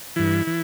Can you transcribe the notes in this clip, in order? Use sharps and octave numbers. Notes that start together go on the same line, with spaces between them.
G2 E3 E4
E3